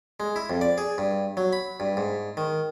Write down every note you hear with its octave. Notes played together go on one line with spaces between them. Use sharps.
G#3
E4
F2
D5
G#4
G2
F#3
B5
G2
G#2
D#3